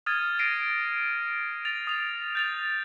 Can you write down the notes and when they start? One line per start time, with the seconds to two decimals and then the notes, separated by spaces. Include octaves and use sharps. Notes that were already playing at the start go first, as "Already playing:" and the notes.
0.06 D#6 F6 G#6 A6 D#7
0.39 A#6 C7 D7 D#7
1.65 A6 F7
1.87 D#6 F7
2.35 G6 A6 F7